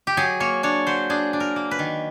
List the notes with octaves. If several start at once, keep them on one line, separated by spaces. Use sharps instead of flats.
G4
F#3 G#4
A#3 C#5
D4 C#5
F#3 C5
D4 G#4
D4
A#4
A#3
B4
D#3